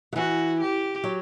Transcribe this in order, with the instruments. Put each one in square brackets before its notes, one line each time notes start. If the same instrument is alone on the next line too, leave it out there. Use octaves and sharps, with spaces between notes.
[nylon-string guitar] F#3
[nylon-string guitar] E3 [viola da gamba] F#4
[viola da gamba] G4
[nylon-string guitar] F#3